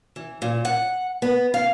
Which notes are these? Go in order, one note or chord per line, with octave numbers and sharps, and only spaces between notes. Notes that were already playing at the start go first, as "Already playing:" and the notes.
E3
A#2
F#5
B3
F5